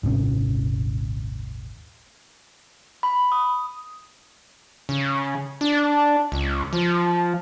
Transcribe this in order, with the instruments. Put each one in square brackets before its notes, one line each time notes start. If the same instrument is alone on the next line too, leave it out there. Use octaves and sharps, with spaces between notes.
[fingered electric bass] D#1 G#1 C3 C#4
[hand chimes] B5
D#6
[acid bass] C#3
D4
C#2
F3